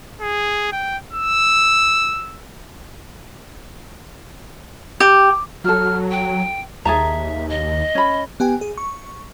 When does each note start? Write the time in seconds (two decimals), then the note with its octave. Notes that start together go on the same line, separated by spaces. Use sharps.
0.21 G#4
0.72 G5
1.13 E6
5.00 G4
5.64 F#3 F#4 A4 F6
6.11 G5
6.85 D#2 G#4 E5 A5 A#5
7.49 D#5
7.95 C#4 B5
8.40 B3 G4 G5 G#5
8.61 G#4
8.78 C#6